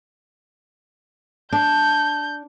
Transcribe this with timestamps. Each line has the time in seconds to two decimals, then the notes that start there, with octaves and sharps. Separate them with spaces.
1.52 D4 G6